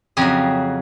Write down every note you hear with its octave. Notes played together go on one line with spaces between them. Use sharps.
F2 C#3 F#3 G#4